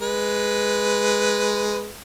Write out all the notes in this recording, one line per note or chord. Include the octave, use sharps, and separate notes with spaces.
G#3 B4